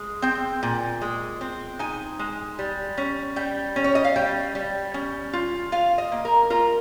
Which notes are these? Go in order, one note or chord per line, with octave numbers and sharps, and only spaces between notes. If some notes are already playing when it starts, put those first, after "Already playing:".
Already playing: G#3
C4 G5
A#2
G#3
C4
D#4 G#5
G#3
G3
C#4
G3 G5
C#4
C#5
D#5
F5
G3 G5
G3
C#4
F4
F4 F5
D#5
A#3
A#4
F4 A#4